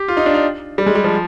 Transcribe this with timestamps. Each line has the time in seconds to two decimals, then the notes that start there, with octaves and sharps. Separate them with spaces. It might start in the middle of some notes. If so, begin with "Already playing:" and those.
Already playing: G4
0.08 F4
0.17 D#4
0.26 D4
0.34 D#4
0.78 G3
0.86 G#3
0.95 G3
1.04 F3